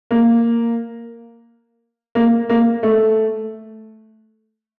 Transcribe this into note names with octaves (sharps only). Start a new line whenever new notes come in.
A#3
A#3
A#3
A3